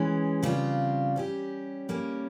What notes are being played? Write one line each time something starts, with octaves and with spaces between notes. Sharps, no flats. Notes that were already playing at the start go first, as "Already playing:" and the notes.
Already playing: E3 G#3 C#4
C#3 G3 C4 F4
G3 C#4 G4
G3 A#3 C#4